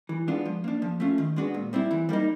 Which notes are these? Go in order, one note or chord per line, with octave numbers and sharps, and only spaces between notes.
E3
G#3 B3 D4 F4
F3
A#3 D4
F3
A3 C#4 F4
D#3
G#3 B3 D4 F#4
A#2
G3 C4 E4
E3
G3 A#3 D#4